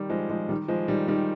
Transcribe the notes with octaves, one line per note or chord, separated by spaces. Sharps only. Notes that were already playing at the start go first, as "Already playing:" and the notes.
Already playing: D#3 G3
F3 G#3
F3 G#3
D#3 G3
F3 G#3
D#3 G3
D#3 G3